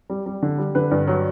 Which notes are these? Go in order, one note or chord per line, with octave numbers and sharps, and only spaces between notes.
G3
G3
D3
G3
D3 B4
G2
F#3